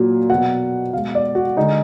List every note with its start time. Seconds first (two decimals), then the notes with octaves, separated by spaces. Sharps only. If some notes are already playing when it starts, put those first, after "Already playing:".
Already playing: A#2 F#3
0.30 B2 F#3 F#5
0.93 B2 F5
0.97 G#3
1.15 D5
1.35 F#4
1.57 D3 G#3 D#4